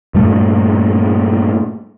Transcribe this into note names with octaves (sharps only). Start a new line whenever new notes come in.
G2 A#2 G3 A3